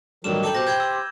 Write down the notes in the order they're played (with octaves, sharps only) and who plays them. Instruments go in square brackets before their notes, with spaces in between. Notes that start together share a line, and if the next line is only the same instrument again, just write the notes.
[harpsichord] A1 G2 [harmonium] D#3 F#3 [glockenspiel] E7
[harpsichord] D#4 A4 G5 [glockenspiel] D6 F#7
[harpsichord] B2 [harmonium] G4 C5 [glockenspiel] D6 G6 A#6
[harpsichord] B4 G5 [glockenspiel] G6 G#6
[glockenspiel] E6